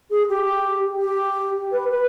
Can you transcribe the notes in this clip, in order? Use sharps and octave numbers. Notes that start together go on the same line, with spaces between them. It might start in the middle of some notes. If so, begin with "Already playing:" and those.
G#4
G4
G4
B4
B4